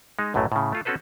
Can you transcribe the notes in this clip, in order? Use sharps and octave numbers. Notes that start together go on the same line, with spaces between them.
G#3 D#4
B1 F#2 A2 F#3 A3
A2 C#3
A3 F4 A4
C4 C#4 F#4 A4 B4 C5